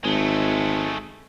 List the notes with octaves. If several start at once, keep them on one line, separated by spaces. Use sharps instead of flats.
G#1 G#3 A3